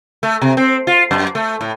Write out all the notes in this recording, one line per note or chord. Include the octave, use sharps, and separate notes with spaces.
A3
C3
C4
F4
F#2
A3
A2